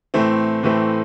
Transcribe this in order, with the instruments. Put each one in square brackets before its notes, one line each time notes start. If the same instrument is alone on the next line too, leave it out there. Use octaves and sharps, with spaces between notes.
[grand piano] A2 E3 A3 C4
A2 E3 A3 C4